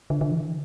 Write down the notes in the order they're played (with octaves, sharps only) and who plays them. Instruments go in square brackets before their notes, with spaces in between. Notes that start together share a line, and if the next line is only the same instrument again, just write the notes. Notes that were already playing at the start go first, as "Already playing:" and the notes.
[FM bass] D3
D3
E3
D3